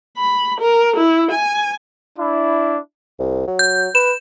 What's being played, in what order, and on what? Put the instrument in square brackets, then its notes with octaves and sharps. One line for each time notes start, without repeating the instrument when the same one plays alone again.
[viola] B5
A#4
E4
G#5
[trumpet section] D4 E4
[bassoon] C2
F#3
[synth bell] G6
[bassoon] B4 [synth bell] E7